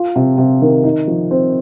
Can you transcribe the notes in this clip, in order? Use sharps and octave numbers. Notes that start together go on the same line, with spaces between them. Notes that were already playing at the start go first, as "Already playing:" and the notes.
Already playing: F4
C3
C3
D#3
D#4
F3
C4